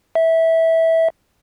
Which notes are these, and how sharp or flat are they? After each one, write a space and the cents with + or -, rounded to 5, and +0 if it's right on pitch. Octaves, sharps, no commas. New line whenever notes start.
E5 -15